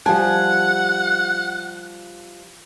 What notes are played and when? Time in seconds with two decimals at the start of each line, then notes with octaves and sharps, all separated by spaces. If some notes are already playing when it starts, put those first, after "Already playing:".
0.06 F3 G3 F#5 G#5 A5